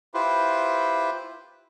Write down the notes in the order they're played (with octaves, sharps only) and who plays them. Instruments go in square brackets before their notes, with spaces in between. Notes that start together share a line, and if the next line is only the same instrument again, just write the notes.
[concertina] E4 F4 G4 B4 C5